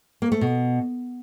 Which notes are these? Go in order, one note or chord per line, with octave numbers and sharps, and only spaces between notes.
A#3
A3
B2